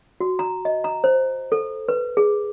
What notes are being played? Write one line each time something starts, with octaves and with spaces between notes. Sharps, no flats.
F#4
A#5
D#5
A#5
C5
A4
B4
G#4